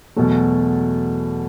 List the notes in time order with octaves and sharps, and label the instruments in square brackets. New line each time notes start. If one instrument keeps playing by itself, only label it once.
[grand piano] E2 B2 F#3 A3